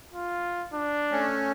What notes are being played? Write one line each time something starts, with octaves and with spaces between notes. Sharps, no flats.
F4
D4
A3 C#4